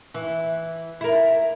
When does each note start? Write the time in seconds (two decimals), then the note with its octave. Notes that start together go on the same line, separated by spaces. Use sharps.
0.14 E3
1.01 E4 A#4